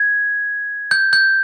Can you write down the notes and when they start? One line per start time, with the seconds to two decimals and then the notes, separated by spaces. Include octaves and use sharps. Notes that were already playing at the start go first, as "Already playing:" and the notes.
Already playing: G#6
0.91 G6
1.13 G6